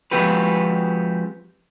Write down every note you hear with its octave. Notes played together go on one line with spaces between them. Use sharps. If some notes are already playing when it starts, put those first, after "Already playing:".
F3 G#3 C4 F#4 G4 B4